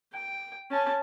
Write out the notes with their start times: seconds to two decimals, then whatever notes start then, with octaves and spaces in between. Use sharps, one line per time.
0.13 G5
0.70 C#4 A5